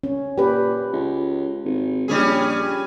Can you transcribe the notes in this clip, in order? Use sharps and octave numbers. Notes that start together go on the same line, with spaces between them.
C#4
A#2 G4 B4
C#2
G#1
A#1 G3 C#4 G#4